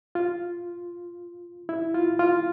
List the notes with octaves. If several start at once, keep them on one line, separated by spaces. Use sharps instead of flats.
F4
E4
F4
F4